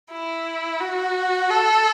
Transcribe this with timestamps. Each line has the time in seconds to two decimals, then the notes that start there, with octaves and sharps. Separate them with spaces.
0.11 E4
0.80 F#4
1.50 A4